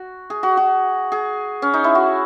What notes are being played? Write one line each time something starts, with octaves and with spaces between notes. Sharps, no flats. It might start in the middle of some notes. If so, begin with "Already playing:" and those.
Already playing: F#4
G#4
F#4
F#4
G#4
C#4
D#4
E4
F#4